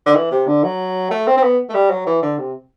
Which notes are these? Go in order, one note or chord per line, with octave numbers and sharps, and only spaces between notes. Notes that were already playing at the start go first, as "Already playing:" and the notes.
D3
E3
C3
D3
F#3
A3
C4
C4
B3
A3
G3
F#3
E3
D3
C3